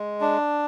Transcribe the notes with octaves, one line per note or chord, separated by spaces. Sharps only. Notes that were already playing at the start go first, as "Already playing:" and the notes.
Already playing: G#3
D4